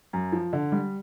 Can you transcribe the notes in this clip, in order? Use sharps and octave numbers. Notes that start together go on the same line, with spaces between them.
F#2
F3
D3
G3